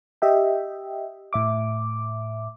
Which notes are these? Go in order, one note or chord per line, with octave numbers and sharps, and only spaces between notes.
G4 D#5 E5 G5
A2 E5 D6